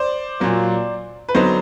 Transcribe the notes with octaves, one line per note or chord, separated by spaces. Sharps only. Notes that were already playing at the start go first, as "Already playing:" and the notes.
Already playing: C5 D5
A#2 F#3 A#3
B4
D3 F#3 B3 D#4 C5